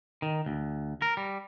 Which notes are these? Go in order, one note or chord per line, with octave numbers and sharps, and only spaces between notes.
D#3
D2
A#4
G3